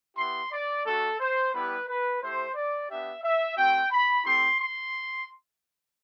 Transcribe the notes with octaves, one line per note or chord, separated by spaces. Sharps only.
B3 E4 G4 C6
D5
A3 D4 F#4 A4
C5
G3 B3 E4 G4 B4
B4
A3 E4 G4 C5
D5
B3 D4 G4 E5
E5
A3 C4 F#4 G5
B5
A3 C4 E4 G4 C6
C6